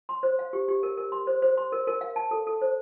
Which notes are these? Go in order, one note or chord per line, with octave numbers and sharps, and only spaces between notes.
C6
C5
F5
G4
G4
A#4
A#4
C6
C5
C5
C6
A#4
A#4
F5
A5
A4
A4
C5